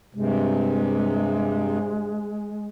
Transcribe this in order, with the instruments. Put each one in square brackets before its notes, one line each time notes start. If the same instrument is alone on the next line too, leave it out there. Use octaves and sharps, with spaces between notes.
[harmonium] G2 C3 [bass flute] G#3